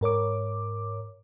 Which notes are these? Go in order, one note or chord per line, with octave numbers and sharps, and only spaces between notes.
G#2 A#4 C#5 D6